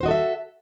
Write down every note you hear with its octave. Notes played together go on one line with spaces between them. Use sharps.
F#4 A4 C5 D#5 E5